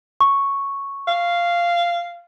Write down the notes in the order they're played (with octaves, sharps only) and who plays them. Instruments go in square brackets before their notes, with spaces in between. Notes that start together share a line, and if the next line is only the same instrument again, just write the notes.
[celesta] C#6
[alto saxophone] F5